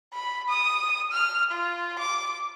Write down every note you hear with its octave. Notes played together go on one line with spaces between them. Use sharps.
B5
D#6
F6
F4
D6